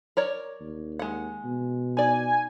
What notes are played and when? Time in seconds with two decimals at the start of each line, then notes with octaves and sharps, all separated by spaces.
0.17 A#4 C#5 D5
0.61 D#2
0.99 G#3 F#5
1.45 B2
1.97 D#4 D5 G#5